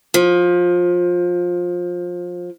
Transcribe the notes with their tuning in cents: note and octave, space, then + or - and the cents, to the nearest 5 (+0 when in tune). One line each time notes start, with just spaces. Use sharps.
F3 +20